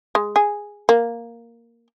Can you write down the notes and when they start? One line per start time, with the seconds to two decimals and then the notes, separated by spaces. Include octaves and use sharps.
0.15 G#3
0.36 G#4
0.89 A#3